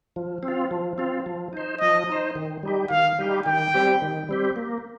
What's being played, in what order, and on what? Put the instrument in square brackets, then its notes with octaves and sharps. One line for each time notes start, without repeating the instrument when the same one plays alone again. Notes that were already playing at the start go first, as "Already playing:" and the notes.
[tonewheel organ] F3
C4
F4
F3
C4 F4
F3
D#4 C5
[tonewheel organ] F3 [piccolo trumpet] D#5
[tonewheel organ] D#4 C5
D#3
G3 D#4 G4
[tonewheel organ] D#3 [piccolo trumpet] F5
[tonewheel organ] G3 D#4 G4
[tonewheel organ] D#3 [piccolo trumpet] G5
[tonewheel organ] G3 C4 G4
D#3
G3 C4 G4
A#3